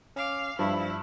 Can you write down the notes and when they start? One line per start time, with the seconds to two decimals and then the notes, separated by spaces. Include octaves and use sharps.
0.16 C#4 F5 D6
0.59 G2 F3 E4